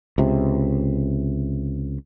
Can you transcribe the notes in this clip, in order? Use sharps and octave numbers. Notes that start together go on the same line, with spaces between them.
C#2 C3